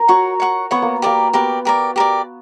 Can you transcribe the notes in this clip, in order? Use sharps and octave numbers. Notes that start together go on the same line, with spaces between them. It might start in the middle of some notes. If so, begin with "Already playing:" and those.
Already playing: A#4
F#4 C#5 F#5 C#6
C#5 F#5 C#6
B3 C#5 F#5 C#6
A#3
A#3 G4 A#4 D5
B3 G4 A#4 D5
G4 A#4 D5
G4 A#4 D5